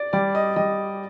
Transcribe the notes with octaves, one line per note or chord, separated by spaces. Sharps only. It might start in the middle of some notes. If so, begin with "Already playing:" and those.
Already playing: D5
G3 D5
D#5
G3 D#5